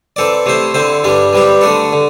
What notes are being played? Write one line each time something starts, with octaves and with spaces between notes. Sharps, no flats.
E3 C4 A4 D5
C3 A3 E4 C5
D3 C4 E4 C5
G2 E3 G3 D4
E3 G3 C4 G4
D3 A3 D4 A4
D3